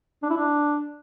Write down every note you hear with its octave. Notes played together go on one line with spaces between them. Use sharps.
D4
E4
D4